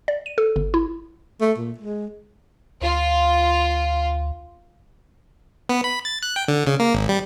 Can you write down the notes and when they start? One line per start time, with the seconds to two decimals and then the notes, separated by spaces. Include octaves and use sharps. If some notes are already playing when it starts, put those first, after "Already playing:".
0.08 D5
0.26 D#7
0.38 A4
0.56 G1
0.74 E4
1.41 A3
1.58 A#2
1.78 G#3
2.81 D2 F4
5.69 B3
5.84 B5
6.05 A6
6.23 F#6
6.36 G5
6.48 D3
6.67 C#3
6.79 A#3
6.94 G#1
7.09 G3